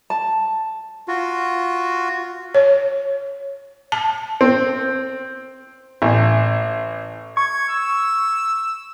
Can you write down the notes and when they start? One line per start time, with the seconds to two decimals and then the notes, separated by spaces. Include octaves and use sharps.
0.10 A5
1.08 F4 F#4
2.55 C#5
3.92 A5
4.41 C4
6.02 A1
7.37 C#6 G#6
7.69 E6